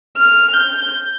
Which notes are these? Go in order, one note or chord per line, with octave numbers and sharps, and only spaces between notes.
F6
G6